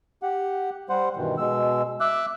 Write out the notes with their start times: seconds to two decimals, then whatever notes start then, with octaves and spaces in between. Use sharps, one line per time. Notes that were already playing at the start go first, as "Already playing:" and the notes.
0.23 G4 F#5
0.89 G3 C5 F#5
1.17 G2 B2 D#3 E3
1.38 B2 G#3 E6
2.00 E5 D6 E6 F#6